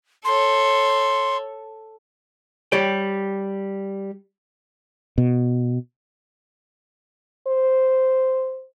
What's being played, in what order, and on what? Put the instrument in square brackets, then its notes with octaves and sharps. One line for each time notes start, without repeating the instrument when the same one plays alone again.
[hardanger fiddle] A4 C#5 [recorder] C6
[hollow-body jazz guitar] G3 G4 C#5 G5
[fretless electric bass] B2
[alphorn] C5